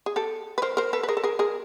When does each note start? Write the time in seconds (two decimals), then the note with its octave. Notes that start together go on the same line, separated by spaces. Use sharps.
0.06 G#4
0.16 G4 A4
0.58 B4
0.62 A#4 C5
0.77 A#4 C5
0.93 A4 B4
1.03 B4
1.08 G#4 A#4
1.17 A4
1.24 G#4 A#4
1.39 G#4 A#4